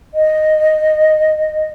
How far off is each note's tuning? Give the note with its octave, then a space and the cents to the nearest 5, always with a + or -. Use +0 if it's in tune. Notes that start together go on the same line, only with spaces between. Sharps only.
D#5 -5